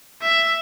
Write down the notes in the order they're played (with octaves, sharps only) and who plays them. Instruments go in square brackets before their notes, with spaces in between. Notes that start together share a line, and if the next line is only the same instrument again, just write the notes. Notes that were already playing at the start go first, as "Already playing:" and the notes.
[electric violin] E5